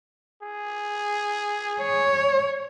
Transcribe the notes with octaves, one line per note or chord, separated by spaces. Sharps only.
G#4
C#5